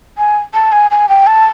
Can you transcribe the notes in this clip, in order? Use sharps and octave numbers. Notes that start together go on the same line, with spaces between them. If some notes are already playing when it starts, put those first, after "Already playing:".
G#5
A5
G#5
G#5
G5
A5